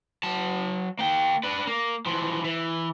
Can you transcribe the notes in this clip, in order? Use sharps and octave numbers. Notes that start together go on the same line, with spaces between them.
F#3 A5
A#3 G5
D4 B4
A#3
E3 F3
E3